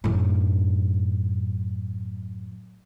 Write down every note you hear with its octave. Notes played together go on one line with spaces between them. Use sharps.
F#2 A2